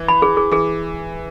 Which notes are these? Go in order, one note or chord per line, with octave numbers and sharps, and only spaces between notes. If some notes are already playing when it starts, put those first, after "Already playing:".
Already playing: E3
B5
G#4
G#4
E3 G#4